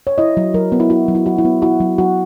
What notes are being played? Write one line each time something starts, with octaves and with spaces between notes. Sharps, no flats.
C#5
E4 D#5
F#3
F#3 A#4
B3
E4
E4 F#4
F#3
E4
F#3 F#4
E4
B3
E4 F#4
F#3
F#3 F#4